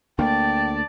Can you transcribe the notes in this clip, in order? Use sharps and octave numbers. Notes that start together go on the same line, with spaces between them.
D2 A#3 D5 G5 A5